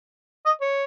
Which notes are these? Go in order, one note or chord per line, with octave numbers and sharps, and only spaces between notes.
D#5
C#5